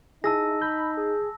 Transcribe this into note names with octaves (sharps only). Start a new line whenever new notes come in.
D#4 E4 G#4 A5 E6 A#6
B5 G6
G#4